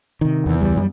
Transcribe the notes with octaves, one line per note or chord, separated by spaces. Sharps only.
C3 D#3
E2
C#2 G3
F#2 F3 G3